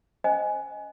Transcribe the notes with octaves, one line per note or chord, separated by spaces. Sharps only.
C#4 C5 D#5 G#5